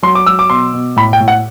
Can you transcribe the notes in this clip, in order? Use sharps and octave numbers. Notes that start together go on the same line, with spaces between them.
F#3 C6
D6
F#3 E6
D6
B2 C6
B2
A2 B5
G5
A2
F#5